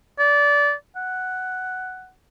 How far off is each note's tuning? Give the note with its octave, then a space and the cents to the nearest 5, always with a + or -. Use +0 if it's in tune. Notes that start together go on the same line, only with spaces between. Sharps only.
D5 -20
F#5 +5